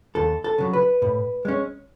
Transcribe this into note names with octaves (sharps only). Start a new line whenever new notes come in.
D#2 A4
A4
C#3 F#3
B4
A2
G#3 C#4